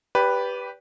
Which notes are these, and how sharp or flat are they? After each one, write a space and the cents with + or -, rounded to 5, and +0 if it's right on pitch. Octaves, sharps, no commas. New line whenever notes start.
G4 +0 B4 +0 D5 -30